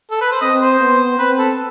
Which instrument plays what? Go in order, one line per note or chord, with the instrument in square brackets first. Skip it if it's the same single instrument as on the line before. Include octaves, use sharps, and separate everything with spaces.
[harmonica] A4
B4
C5
[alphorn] C4 [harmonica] D#5
[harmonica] C5
[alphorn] B3
[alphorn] C4 [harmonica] B4
[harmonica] A4